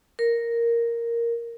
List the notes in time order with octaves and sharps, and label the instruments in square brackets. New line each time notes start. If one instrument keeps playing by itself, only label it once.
[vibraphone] A#4